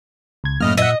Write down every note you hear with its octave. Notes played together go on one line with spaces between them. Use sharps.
C#2 G#6
F#2 A2 A#3 D#5 F6
A#2 D#5 E5 F#5